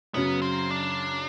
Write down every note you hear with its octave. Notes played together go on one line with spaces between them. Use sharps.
F#2 C#3 F#3 B3
C4
D4